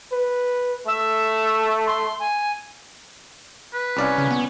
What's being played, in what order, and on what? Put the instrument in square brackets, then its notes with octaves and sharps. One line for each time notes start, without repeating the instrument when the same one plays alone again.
[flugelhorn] B4
[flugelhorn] A3 [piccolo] E5
[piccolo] C6
G#5
[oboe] B4
[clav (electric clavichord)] C2 D5 F5 [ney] C#4
[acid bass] C#3
B3